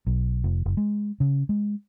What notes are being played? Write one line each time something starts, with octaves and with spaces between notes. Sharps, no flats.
B1
F1
F#1
G#3
C#3
G#3